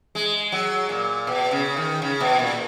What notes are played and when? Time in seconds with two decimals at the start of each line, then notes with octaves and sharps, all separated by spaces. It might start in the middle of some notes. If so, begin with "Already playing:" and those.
0.15 G#3
0.52 F#3
0.89 A#2
1.27 B2
1.51 C#3
1.77 D#3
2.02 C#3
2.20 B2
2.39 A#2